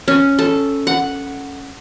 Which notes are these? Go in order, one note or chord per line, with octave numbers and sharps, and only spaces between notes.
C#4
A4
F#5